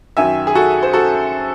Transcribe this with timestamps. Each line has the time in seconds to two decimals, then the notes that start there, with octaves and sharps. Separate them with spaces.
0.17 F#2 D#3 F#3 E5 G#5
0.47 G#4
0.55 F#4 A4
0.83 C5
0.93 F#4 A4